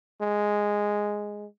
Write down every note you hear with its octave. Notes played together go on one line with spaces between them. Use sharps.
G#3